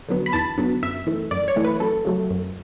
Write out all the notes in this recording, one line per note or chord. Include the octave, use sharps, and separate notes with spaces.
D3 F#3 B3
B5
E2 A5
D3 F#3 B3
F#2 E5
E3 A3
F#2 D5
C#5
E3 A3
B4
F#2 A4
C#3 F#3 A3
F#2